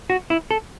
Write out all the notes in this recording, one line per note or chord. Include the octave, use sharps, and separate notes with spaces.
F#4
E4
A4